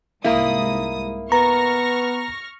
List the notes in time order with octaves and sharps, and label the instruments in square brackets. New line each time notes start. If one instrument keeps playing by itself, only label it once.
[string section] C2 G#2 D#6 [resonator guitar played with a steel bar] A#3 E4
[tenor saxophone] B3 [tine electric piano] A#5 [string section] C#6 F6 A#6